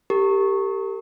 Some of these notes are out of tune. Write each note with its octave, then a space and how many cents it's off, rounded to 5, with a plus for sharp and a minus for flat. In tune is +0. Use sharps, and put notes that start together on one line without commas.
G4 +0 A#4 -45